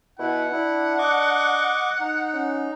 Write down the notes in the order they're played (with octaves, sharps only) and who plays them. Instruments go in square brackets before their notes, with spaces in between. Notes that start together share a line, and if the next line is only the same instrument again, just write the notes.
[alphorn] B2 [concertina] E4 [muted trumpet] F#5
[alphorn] D4 [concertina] E4
[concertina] D#5 C#6 D6
D#4
[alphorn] C#4